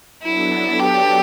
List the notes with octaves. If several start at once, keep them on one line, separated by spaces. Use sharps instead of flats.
F#3 B3 D4 E4 A4
G4